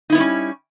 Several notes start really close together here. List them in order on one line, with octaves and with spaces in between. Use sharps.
D#4 E4 B3 G3 C#4